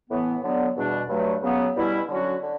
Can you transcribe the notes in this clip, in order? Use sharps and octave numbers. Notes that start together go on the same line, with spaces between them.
A2 E3 B3
D3 F#3 B3
E2 B2 G3 D4
G2 F#3 A3
C#3 F#3 B3
B2 G3 C#4 E4
D3 F#3 C#4 F#4
D3